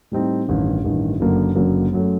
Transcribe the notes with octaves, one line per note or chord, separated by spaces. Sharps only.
A2 G3 C4 D#4
A1 G2 D#3
A1 G2 D#3
F#1 F#2 D3 F#3 A#3
F#1 F#2 D3 F#3 A#3
F#2 F#3 A3